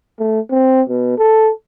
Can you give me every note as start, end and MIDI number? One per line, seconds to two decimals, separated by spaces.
0.19 0.40 57
0.51 0.82 60
0.88 1.14 47
1.18 1.52 69